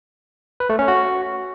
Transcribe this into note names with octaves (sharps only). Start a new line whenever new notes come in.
B4
A3
C#4
F#4